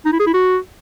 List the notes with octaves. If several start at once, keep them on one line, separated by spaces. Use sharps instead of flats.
D#4
E4
G#4
E4
F#4